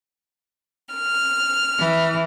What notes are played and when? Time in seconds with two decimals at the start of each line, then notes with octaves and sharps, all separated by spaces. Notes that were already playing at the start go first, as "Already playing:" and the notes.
0.95 F6
1.79 E3